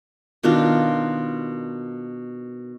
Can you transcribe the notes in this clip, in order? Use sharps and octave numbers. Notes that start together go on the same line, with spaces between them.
B2 D#3 D4 F4